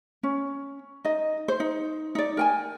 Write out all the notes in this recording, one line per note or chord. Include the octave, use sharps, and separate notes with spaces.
C#4
D#4 D#5
C5
D#4
D#4 D5
A#4 G5 G#5